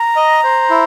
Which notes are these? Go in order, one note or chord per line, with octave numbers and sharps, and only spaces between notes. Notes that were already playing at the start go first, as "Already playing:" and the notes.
Already playing: A#5
D#5
C5
E4